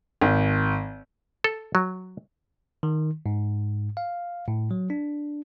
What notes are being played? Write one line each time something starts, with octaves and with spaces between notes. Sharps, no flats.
G#1
A4
F#3
D#3
G#2
F5
A2
F#3
D4